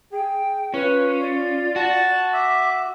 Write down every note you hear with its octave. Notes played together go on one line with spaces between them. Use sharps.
G#4 G5
C#4 F4 B4
D5
F#4 A5
E5 D6